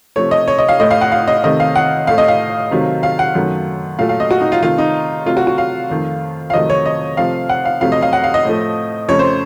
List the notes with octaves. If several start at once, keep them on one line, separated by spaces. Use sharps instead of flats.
C3 F3 A3 C#5
D#5
C#5
D#5
F5
A2 A3 D#5
F5
F#5
F5
D#5
C3 D#3 A3 D#5
F5
F#5
A2 A3 F5
D#5
F5
C3 D#3 F#3 A3
F5
F#5
F#2 D#3 F#3 A3
A#2 F#3 A3 F5
F5
D#5
F#4
D#4
F4
C3 D#3 A3 F4
D#4
C3 F#3 A3 F4
F#4
F#4
F5
F2 D#3 A3
F5
F2 C3 D#3 F#3 A3 D#5
C#5
D#5
C3 F3 A3 F5
F#5
F5
F2 C3 F#3 A3 F5
D#5
F5
F#5
F5
D#5
A2 F3 A3
F2 C#3 A3 C#5
C5